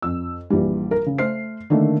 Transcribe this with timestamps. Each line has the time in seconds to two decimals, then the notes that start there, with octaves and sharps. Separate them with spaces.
0.02 F2 E6
0.50 A#1 E3 G3
0.91 A#4
1.06 C#3
1.18 A3 C5 F6 C7
1.70 D3 D#3 A3 A#3